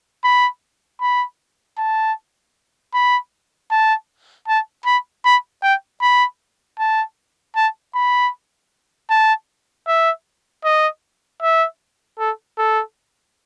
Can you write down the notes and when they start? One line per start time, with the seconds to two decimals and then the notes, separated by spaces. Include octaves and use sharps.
0.24 B5
1.01 B5
1.78 A5
2.94 B5
3.71 A5
4.48 A5
4.86 B5
5.25 B5
5.63 G5
6.01 B5
6.79 A5
7.56 A5
7.95 B5
9.10 A5
9.87 E5
10.64 D#5
11.42 E5
12.19 A4
12.58 A4